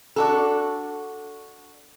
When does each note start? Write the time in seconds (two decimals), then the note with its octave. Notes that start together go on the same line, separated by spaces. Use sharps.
0.16 D4 F#4 A4